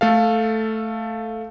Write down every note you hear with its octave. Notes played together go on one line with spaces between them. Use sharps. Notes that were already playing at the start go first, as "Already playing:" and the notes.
A3 A4 F5